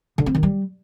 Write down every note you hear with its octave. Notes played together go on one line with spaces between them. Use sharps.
D3
C4
D#3
G3